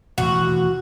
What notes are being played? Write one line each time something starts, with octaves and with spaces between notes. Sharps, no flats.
E1 A1 D#2 F#4